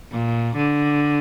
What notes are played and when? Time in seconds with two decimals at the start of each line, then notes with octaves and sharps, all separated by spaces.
0.11 A#2
0.56 D3